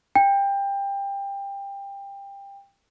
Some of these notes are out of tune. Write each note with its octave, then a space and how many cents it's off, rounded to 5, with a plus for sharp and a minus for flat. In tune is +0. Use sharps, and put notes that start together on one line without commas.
G5 +20